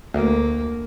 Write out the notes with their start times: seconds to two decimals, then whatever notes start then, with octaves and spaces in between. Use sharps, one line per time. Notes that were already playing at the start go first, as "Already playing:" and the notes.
0.14 D2 A#3